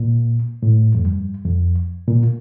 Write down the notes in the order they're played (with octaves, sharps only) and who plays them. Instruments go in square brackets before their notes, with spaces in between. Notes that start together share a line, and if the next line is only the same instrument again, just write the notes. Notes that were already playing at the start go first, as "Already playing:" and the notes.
Already playing: [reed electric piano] A#2
A2
F2
G2
F2
A#2